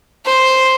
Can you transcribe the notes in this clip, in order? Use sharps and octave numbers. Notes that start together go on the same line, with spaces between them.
C5